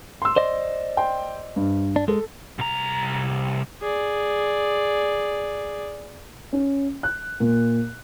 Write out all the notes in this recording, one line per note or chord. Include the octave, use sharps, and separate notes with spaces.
C6 E6
C5 D5 D#5
G5 C6
G2
D4
G#3 A4
C2 A#5
G#4 D5
C#4
F#6
A#2